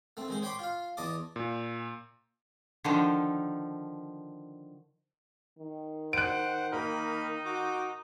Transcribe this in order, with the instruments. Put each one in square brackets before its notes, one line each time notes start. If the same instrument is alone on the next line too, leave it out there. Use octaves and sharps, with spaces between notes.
[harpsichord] A3 C4
D#3 G#3 C5
C#5 G5 B5 C6 D6
F4 F5
E2 D#5 A5 D6
[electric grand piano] A#2
[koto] D3 D#3 F3
[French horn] D#3
[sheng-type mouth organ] C5 F#5 [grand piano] F#6 D7
[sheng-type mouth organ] A#3 B5 [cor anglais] D#4 [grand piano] A#4
[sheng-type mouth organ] F#4 D6